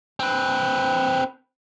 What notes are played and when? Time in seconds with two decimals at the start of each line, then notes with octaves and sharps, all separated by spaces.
0.20 C4 B4